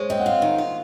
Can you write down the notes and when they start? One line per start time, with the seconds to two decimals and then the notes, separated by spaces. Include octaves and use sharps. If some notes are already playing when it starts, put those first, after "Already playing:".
Already playing: G#3 C5 C#5
0.10 C4 D#5
0.20 F#5
0.26 F4 F5
0.42 D#3
0.58 F4